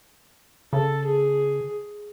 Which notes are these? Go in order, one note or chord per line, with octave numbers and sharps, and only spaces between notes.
C#3 A4
G#4